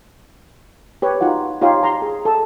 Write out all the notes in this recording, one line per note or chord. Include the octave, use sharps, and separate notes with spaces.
G4 B4 C#5
D#4 F4 F#4 F#5
D#4 F4 G4 C#5 F5 C6
A#5 C6
G#4
A4 A5